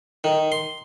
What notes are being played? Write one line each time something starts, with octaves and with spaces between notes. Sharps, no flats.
D#3
C6